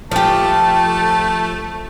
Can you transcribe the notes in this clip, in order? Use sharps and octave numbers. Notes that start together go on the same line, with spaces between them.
F3 A3 G4 A5